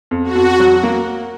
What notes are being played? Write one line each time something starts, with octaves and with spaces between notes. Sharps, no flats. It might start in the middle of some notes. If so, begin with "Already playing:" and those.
F2
F#4
F2
F#3
A#3